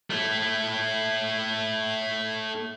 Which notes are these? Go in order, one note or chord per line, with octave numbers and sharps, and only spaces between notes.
A3 E4